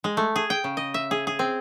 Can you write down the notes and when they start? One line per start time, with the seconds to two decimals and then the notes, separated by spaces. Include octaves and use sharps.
0.04 G#3
0.17 A3
0.36 G#4
0.50 G5
0.64 C#3
0.77 D#5
0.94 E5
1.11 G#4
1.27 G#4
1.39 C4